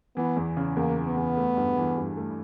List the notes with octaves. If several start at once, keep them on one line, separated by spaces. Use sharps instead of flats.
E3 B3
E2
C#3
E2 A#3
E3
B3
E2
A3
G2
E3
G2
A3